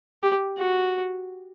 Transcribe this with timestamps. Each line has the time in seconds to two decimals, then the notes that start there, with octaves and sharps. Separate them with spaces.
0.23 G4
0.58 F#4